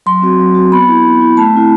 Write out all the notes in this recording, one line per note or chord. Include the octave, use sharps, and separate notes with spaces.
F#3 C6
C4 F#4
F#3
C4 F#4
B3 B5
E4
B3
E4
A3 A5
C4 E4